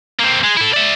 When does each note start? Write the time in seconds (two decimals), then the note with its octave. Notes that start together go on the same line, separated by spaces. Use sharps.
0.20 A#3 C4
0.44 G#3
0.57 E4 A4
0.74 D5 E5